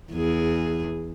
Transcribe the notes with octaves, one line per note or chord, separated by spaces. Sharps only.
E2 G#4